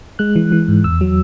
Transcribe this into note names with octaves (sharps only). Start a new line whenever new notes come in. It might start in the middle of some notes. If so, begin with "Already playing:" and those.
G#3 F#6
E3
E3
G#2
E2 E6
F#3